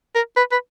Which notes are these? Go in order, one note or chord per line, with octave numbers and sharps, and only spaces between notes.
A#4
B4
B4